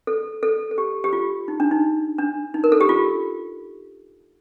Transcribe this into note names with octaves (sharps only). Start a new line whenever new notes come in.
A4
A4
A4
G4
G4
F4
D#4
D4
D#4
D4
D#4
A#4
A4
G4
F4